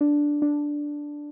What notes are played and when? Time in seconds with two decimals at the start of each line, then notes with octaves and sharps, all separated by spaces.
0.01 D4
0.42 D4